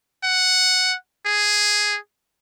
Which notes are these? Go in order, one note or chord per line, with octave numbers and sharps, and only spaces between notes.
F#5
G#4